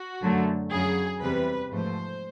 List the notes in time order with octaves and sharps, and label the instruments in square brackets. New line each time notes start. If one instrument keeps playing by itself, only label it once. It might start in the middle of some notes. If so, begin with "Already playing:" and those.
Already playing: [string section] F#4
F#2 D3 F#3 A3
F#2 C#3 F#3 G#4
E2 C3 E3 G3 B4
G#2 F3 A3 C5